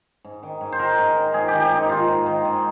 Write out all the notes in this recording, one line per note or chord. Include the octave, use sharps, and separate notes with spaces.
G#2
D#3
G#2
C5
D#3 A#4
G#2
D#3
G#2 G#4
D#3 G4
G4
G#2 D#4
D#3 F4
G#2
D#3
G#2